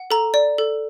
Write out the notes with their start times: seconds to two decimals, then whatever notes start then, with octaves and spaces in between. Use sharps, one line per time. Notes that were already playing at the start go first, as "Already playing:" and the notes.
Already playing: F#5
0.11 A4 A#5
0.34 D5
0.58 A4